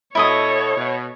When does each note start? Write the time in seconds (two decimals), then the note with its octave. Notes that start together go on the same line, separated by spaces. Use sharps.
0.15 B2 E4 A4 C#5 D#5 D#6
0.76 B2